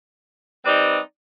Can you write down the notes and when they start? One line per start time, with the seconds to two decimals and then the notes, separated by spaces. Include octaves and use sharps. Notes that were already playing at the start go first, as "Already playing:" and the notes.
0.65 G3 C4 D#4 B4 D5